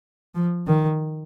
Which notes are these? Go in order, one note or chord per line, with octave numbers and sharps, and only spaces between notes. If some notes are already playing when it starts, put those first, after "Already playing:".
F3
D#3